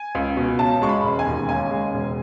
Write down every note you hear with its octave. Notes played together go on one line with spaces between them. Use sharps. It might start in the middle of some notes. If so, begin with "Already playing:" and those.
Already playing: G#5
C#2
B2
C#3 A5
G#3 C#6
B5
E1
G#5
D#2
C#3 G#5
G#3
E1